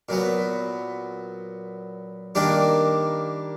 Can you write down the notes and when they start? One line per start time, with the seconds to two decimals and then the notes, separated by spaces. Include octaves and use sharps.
0.09 A#2 F#3 B3
2.35 D#3 G3 A#3 D4 G4